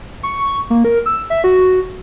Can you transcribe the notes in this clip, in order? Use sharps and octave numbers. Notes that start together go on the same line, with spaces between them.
C#6
A#3
A#4
E6
E5
F#4